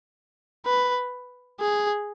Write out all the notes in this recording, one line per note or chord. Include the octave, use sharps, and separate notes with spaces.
B4
G#4